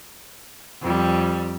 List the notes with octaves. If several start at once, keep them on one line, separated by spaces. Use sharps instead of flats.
F2 G3